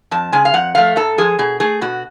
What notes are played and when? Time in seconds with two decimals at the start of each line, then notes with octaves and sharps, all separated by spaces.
0.11 F2 A5
0.32 C#3 G#3 G#5
0.45 F5
0.54 F2 F#5
0.75 F3 A3 F5
0.96 G#2 A4
1.18 F3 G#3 G#4
1.39 B2 G#4
1.60 A3 G#4
1.81 B2 F#4